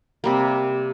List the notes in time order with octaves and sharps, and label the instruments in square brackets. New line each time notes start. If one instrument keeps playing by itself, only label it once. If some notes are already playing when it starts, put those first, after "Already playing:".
[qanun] C3 G3 A#3